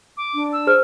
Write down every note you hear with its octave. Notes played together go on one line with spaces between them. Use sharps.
D6
D4
E6
G#4 C5 F6